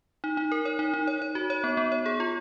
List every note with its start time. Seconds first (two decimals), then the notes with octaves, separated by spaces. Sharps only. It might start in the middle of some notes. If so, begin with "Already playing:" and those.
0.24 D#4
0.37 D#4
0.52 A#4
0.65 C#5
0.79 D#4
0.94 D#4
1.07 C#5
1.22 C#5
1.35 F#4
1.50 C#5
1.64 B3
1.77 B3
1.92 C#5
2.06 G#4
2.20 F4